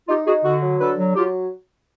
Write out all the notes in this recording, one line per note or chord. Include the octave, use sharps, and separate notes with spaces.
D#4 F4 G4
D#4 F#4 G#4
D3 F#4
F#3
D3 A4 B4
F#3
F#3 F4 G4